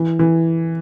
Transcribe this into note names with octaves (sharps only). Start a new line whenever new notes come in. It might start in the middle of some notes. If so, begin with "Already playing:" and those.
Already playing: E3
E3